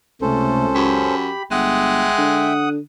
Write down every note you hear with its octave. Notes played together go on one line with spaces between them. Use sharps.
C#2 C3 A3 C#4 A4 C5
F#2 G4 B5
G1 G#3 E5 F#5 G5 D#6
D3